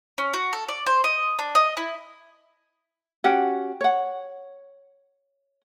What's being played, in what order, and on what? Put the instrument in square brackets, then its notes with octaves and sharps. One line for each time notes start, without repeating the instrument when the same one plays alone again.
[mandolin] C#4
F#4
A4
D5
C5
D#5
D4
D#5
E4
[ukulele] C#4 F#4 G4 F#5
C#5 F#5